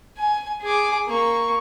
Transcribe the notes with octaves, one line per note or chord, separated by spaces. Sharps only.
G#5
G#4 D6
A#3 C#6